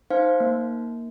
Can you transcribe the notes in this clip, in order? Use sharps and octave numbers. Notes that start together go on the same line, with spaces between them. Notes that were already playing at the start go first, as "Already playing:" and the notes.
D#4 C5 F5
A#3